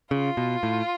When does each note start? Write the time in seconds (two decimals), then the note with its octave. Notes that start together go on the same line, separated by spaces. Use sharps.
0.11 C#3 F4
0.37 B2
0.63 A2